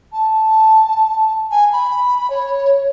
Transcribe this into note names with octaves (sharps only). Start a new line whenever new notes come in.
A5
G#5
B5
C#5